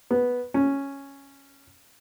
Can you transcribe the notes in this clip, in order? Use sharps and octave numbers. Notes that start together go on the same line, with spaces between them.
B3
C#4